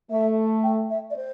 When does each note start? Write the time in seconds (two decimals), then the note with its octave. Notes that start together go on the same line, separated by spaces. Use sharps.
0.10 A3 E5
0.63 G5
0.90 E5
1.11 D5
1.16 C5